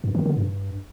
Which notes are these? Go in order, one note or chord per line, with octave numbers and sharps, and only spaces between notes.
G2
D#3
D3
G2